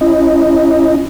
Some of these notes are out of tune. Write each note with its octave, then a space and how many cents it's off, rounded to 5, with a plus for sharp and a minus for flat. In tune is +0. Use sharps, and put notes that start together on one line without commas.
C#4 +0 E4 +30 D#5 +0